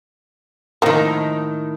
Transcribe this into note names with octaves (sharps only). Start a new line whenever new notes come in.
A2 D#3 F3 A#3